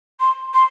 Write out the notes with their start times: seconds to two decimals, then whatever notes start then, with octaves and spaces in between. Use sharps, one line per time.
0.20 C6
0.53 C6